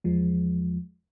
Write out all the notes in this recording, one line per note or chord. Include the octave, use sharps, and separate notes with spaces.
E2 F3 G#3